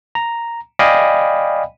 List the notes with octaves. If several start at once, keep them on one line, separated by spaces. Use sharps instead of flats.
A#5
D5 D#5 F5 G5 G#5 B5